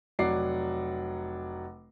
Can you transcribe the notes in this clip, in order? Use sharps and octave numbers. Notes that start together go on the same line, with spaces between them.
F1 F#3 D5 F#5 D6 C7